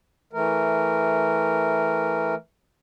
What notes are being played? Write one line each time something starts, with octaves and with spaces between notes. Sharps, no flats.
E3 A3 A#4